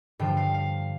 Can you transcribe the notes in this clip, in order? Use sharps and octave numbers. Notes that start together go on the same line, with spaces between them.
G2 D3 F3 G5
F5
F5